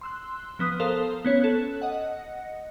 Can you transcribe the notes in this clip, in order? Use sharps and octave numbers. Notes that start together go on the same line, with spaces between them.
C6 E6 F#6
F3 B3 D#6 F#6
A4 A#4 C5 F5 D#6
B3 C#4 C#5
A4 F#6
D#5 F#5